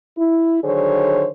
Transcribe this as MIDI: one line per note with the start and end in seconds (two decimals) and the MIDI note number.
0.17 0.60 64
0.63 1.27 50
0.63 1.27 51
0.63 1.27 54
0.63 1.27 68
0.63 1.27 72
0.63 1.27 73